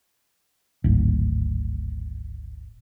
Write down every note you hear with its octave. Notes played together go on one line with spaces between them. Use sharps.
D1 G#1